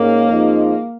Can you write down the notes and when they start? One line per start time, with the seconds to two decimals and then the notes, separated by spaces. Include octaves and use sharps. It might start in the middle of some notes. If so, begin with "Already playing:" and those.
Already playing: G#2 G#3 A#3 C#4 A#4
0.29 F2 F3 G#3 D#4